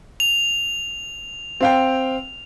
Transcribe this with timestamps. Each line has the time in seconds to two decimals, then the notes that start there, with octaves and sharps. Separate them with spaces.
0.20 F7
1.61 C4 F5 G5